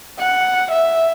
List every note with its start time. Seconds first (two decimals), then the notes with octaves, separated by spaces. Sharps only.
0.19 F#5
0.71 E5